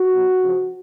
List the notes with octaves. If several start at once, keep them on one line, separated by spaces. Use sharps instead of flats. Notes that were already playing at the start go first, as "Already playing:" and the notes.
Already playing: F#4
B2 F#3
C#3 F3